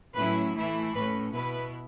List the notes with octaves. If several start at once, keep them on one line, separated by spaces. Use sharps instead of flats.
A2 F#3 C#4 E4 B4
E3 A3 E4
A2 A3 C#4 B4
B2 B3 E4 B4